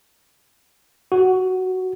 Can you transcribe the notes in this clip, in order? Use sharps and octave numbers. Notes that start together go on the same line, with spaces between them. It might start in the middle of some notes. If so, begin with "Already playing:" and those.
F#4